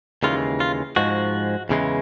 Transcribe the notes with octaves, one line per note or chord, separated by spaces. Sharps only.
D#2 C#3 E3 G#3 F4
F4
G#2 F3 G#3 F#4
E2 C#3 E3 G#3